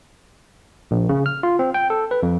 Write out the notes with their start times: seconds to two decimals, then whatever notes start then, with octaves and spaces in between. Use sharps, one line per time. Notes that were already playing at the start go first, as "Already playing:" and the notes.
0.91 A#1
1.09 C#3
1.26 F6
1.43 F4
1.59 C4
1.74 G5
1.90 A4
2.11 B4
2.23 F2